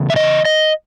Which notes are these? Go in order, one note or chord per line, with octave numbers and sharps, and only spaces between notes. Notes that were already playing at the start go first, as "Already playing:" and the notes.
Already playing: E2 C#3
E5
D#5
D#5